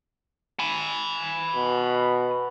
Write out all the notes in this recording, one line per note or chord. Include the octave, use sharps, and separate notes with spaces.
G#5 B5
B2